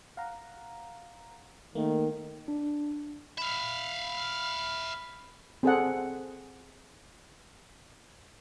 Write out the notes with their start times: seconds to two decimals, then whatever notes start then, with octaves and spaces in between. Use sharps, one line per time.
0.17 F5 F#5 A#5
1.75 D#3 A3 A#3
2.48 D4
3.38 E5 F5 B5
5.63 C4 G#4 A4 F#5